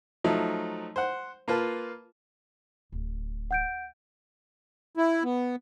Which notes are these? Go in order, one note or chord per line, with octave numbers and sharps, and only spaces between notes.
F3 F#3 A3 D#4
C5 F#5
A#3 F4 B4 A5
D1
F#5 G6 D7
E4
B3